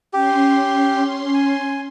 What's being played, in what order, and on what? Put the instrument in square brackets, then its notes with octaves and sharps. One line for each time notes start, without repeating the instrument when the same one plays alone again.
[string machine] C#4 C6 [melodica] G4
[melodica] G#5